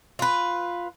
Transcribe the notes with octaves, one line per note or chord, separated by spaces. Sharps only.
F4 B4